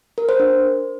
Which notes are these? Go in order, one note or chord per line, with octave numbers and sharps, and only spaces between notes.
A#4
C5
D4